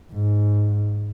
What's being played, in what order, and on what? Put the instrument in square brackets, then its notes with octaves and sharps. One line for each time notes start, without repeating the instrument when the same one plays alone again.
[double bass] G#2